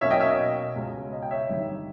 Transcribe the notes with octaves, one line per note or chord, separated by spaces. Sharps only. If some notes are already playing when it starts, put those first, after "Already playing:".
B1 B2 A#3 C#4 C#5 E5
D#5 G5
C#5 E5
D#5
C#2 B2 G#3 C#4
D#5
G5
C#5 E5
G1 G2 D#3